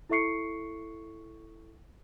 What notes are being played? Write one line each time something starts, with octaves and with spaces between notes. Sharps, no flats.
E4 A4 E5 C#6 C7 C#7